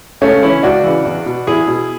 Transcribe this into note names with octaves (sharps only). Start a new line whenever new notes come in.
C#2 A3 C#4
C#3 E3 C#4 E4
C#2 D4 F#4
C#3 E3
E2
B2
E2 E4 G#4
B2